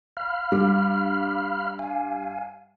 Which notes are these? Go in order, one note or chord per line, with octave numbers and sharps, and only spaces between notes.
F5 B5 F6
G2 G3
F5 G#5